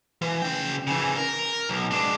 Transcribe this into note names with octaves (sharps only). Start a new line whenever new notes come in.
E3
C#3 G5
C#3 E3
A#4
B1
G#3 D4